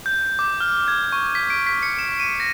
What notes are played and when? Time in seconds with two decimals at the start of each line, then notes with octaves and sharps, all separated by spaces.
0.06 G6
0.39 D6
0.60 F6
0.88 G#6
1.12 C#6
1.35 B6
1.50 D7
1.66 B6
1.83 C#7
1.99 E7
2.20 D#7
2.40 A#6